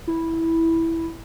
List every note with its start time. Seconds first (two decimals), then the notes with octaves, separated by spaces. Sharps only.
0.07 E4